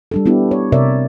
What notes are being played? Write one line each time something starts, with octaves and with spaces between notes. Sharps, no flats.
G3 D4 A4
B3 D4 E4 G4
C#5
C3 A#4 C#5 D5 E5